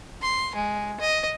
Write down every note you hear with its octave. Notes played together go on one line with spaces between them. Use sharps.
C6
G#3
D#5